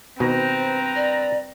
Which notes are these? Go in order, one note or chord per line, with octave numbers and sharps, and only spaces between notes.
G2 B2 D#3 C4 B4 C5 A#5
D5